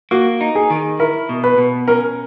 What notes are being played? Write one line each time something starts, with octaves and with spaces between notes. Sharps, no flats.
A#3 F#4
D#4
G#4
D#3
E4 A#4
B2
B4
B2
C#4 A#4